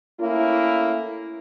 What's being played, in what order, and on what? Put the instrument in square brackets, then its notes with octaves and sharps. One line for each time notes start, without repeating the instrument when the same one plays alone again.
[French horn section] A3 A#3 C#4 E4